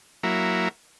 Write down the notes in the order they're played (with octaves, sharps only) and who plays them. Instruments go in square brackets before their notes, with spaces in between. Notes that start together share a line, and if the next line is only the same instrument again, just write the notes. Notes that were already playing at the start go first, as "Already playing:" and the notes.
[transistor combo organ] F#3 A#3 E4